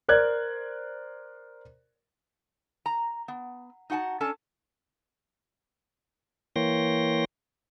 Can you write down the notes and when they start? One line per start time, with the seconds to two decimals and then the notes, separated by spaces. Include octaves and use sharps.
0.08 A#4 C5 D5 F#6 G#6
2.86 A#5
3.28 B3
3.90 D#4 F#4 F#5 G5 A5
4.21 C#4 D4 A4 A5
6.56 E3 A#3 C#5 G5 C6 A#6